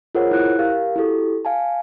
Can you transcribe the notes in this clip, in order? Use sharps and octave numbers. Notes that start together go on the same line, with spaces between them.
F4 G#4 A#4 C5 C#5 F#5
E4 C5 F#6
G4 A#4 F5
E4 F#4 G4 A4
F5 G#5 A5